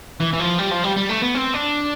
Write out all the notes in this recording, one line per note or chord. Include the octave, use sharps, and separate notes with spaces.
E3
E3
F3
G3
F3
G3
G3
A3
B3
C4
D4